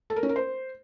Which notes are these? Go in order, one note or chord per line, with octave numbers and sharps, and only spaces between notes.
A4
A#4
C#4
A#4
C5